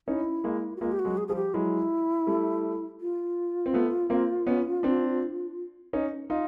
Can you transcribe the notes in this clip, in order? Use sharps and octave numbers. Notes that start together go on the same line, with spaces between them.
C#4 D#4 E4
G#3 A#3
F#4
G#3 A#3 F4
G4
F#4
F#3 G#3
G#4
F3 G3 G#4
G4
F#3 G#3 E4
G3 A3
F4
C4
A3 B3
A#3 C4
B3 C#4
C4 D4
C#4 D#4
D#4 F4